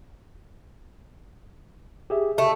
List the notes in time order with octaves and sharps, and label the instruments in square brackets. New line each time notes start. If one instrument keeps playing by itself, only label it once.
[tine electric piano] G4 G#4 E5
[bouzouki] A3 [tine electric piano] A4